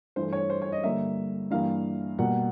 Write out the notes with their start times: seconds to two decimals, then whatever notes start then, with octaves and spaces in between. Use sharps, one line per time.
0.16 G2 E3 A3 C5
0.33 C#5
0.50 C5
0.62 C#5
0.72 D#5
0.84 G2 D3 G3 A#3 E5
1.51 G2 E3 G3 A#3 F5
2.19 B2 G3 A#3 F#5